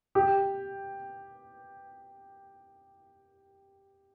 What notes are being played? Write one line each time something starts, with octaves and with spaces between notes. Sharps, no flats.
G4